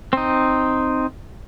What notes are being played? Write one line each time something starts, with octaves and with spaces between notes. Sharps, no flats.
C4 D#4